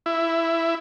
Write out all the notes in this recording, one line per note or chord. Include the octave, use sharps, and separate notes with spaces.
E4